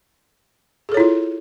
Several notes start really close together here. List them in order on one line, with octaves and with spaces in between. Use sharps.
G#4 A4 C#5 E4 F4